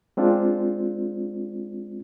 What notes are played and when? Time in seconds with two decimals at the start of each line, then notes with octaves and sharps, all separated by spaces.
0.17 G#3 C4 D4 F4